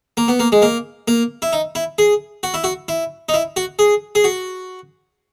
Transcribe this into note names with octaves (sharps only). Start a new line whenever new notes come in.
A#3
B3
A#3
G#3
A#3
A#3
E4
D#4
E4
G#4
F#4
E4
F#4
E4
D#4
E4
F#4
G#4
G#4
F#4